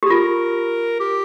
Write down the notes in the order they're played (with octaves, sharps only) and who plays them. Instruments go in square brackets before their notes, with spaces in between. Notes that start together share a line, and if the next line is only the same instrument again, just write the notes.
[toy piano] G4 [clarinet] G#4
[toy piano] F4 [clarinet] A#4
[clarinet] G4